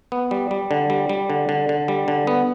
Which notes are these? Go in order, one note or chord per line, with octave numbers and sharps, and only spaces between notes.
B3
G3
G3
D3
G3
G3
D3
D3
D3
G3
D3
B3